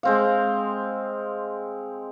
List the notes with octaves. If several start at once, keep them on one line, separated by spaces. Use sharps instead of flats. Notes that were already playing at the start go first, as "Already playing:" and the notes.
G#3 C4 F5